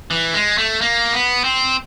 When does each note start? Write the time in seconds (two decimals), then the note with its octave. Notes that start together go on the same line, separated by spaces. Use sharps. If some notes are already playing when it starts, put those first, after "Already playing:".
0.11 E3
0.34 G#3
0.58 A3
0.81 A#3
1.13 B3
1.44 C4